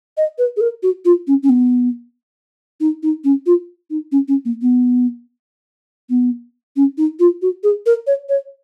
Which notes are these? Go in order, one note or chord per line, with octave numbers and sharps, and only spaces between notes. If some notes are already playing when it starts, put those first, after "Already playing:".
D#5
B4
G#4
A#4
F#4
F4
C#4
C#4
B3
D#4
D#4
C#4
F4
D#4
C#4
C#4
A#3
B3
B3
C#4
D#4
F4
F#4
G#4
A#4
C#5
C#5